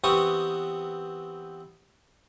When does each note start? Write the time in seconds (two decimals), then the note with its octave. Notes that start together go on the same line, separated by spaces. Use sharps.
0.04 E3 B3 C4 G4 C#6 D#6